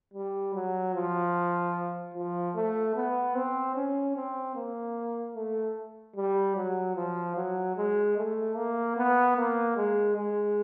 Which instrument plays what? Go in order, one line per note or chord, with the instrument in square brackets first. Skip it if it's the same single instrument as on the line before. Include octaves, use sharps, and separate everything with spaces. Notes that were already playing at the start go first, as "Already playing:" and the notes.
[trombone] G3
F#3
F3
F3
A3
B3
C4
C#4
C4
A#3
A3
G3
F#3
F3
F#3
G#3
A3
A#3
B3
A#3
G#3
G#3